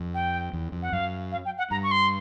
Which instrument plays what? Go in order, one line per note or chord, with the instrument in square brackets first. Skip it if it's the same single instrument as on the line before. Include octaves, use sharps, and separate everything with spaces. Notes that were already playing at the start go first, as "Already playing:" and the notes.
Already playing: [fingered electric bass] F2
[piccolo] G5
[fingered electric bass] E2
F2
[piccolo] F#5
[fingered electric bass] F#2 [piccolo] F5
[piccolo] F5
G5
F#5
[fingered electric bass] G2 [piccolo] A#5
[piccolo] C#6
C6